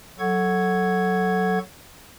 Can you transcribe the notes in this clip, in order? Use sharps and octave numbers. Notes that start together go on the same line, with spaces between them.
F#3 A4 F#5 C#6 G#6